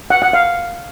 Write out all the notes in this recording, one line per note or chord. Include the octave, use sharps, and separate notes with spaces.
F#5
F#5
F5